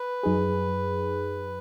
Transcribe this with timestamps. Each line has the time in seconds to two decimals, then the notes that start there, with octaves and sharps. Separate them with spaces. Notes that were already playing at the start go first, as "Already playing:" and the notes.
Already playing: B4
0.23 F#2 F#3 D#4 G#4